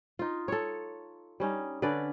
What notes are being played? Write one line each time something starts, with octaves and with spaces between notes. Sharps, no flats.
D#4 F4
A4 C#5
G3 C#4 D#4
D3 C#4 B4 D5